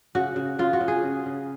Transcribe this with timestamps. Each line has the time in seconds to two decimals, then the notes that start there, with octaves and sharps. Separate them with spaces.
0.15 C#3 F#4
0.36 C#3
0.59 C#3 F4
0.73 F#4
0.81 C#3
0.88 G#4
1.03 C#3
1.26 C#3